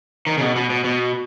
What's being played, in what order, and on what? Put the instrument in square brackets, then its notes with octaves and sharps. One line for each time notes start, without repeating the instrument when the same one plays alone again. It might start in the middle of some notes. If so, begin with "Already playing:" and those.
[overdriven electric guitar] D#3
C#3
B2
B2
B2
B2